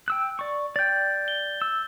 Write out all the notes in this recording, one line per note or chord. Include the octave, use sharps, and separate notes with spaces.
G5 E6 F#6
D5 C#6
D5 G5 G6 A6
G7
E6